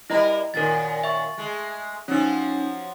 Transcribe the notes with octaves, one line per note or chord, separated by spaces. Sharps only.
G3 E4 A#4 D#5 E5 A#5
F#2 A#2 D#3 A#4 A6
E5 C#6
G#3 A3
F3 F#3 C#4 D#4